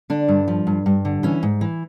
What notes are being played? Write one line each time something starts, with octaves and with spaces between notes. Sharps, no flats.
D3 D4
G2
F3
G2
G2
D3
E3 C#4
G#2
E3